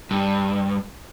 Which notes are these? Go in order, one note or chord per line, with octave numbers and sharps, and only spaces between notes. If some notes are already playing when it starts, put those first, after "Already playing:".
G2